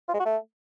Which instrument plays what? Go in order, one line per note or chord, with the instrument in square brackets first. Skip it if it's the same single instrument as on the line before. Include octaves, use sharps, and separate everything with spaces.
[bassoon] F4
G#3
F#4
A3